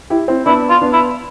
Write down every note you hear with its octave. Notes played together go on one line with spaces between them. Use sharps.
E4 G4
C4 E4
B3 D4 E4
F4
B3 D4
E4